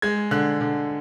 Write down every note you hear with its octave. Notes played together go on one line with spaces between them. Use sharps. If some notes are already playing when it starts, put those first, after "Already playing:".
G#3 G#6
D3 F#6
D3